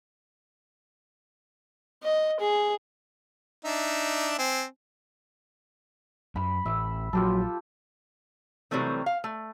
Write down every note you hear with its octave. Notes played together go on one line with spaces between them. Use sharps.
D#5
G#4
D4 D#4 E5
C4 G#5
F#2 B5
A1 E5
A#1 F#3 F4 G4 A4
C3 E3 F#3 G3 A3 C4
F5
A3